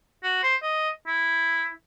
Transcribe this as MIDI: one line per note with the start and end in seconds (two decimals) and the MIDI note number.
0.23 0.38 66
0.43 0.55 72
0.62 0.89 75
1.07 1.70 64